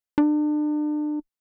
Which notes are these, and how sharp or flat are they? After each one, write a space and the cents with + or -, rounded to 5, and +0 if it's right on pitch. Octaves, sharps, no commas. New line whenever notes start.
D4 +35